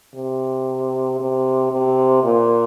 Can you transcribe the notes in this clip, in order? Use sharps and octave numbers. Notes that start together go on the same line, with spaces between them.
C3
C3
C3
A#2